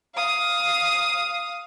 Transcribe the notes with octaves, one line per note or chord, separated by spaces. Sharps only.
F5 D#6